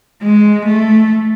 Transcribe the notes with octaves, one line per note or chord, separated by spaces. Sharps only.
G#3
A3